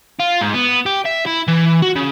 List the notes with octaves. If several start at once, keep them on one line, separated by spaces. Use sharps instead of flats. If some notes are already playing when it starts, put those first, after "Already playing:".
F4
G#2
B3
G4
E5
E4
E3
F#4
C#3